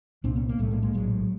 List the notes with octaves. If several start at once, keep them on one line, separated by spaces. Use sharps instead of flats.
C2 A#2 C4 D4
B3 C#4
A#3
B1 A2 G3 A3
G#3 A#3
G#3 A#3
A#1 A2 F#3 G#3